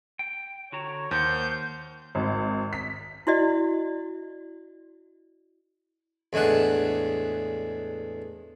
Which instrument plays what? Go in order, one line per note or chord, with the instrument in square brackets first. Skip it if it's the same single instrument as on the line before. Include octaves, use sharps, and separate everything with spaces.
[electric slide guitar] G5
[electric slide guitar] D3 F#4 A#5 [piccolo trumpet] C#5
[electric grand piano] D#2 [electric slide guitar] A#4 F#5 [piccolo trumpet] C5 [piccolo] G6
[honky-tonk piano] G#1
B6
[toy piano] E4 F#4 D5 D#5
[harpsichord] E2 A2 G#3 D4 F#5